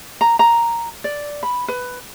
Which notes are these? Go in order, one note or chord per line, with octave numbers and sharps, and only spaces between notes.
A#5
A#5
D5
B5
B4